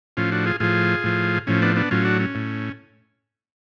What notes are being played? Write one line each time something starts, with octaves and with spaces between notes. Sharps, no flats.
A2 F3 C#4 F4
D4 F#4
F4 G#4
A2 F3 F4 G#4
A2 F3
A2 F3 C#4
B3 D4
B3 D4
A2 F#3 C#4 F4
D4 F#4
C#4
A2